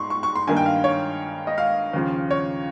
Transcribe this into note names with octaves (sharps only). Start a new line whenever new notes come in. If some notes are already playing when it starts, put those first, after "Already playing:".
Already playing: G#2 C6 C#6
C#6
C#6
C6
G2 D#3 A#3 G#5
G5
F5
C#5
D#5
F5
D#2 C#3 F3
C#5